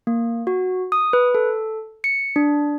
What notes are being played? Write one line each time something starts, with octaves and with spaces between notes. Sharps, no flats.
A#3
F#4
D#6
B4
A4
C#7
D4